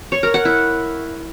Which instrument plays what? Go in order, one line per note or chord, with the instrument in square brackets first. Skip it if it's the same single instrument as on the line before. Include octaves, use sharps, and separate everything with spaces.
[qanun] C#5
A#4
F#5
E4